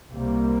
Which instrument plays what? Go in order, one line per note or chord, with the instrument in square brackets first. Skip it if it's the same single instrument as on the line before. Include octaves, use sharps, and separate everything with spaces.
[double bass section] C2 C3 G3 A#3